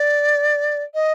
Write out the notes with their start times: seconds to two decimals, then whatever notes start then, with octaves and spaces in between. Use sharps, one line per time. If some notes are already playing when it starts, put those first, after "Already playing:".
Already playing: D5
0.94 D#5